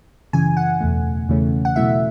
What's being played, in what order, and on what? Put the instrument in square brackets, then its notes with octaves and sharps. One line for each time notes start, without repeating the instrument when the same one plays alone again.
[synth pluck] F#2 C#3 E3 G#5
F#5
E2 B2 A3
E2 C#3 E3 A3 C#4
F#5
B2 F#3 A3 E4 E5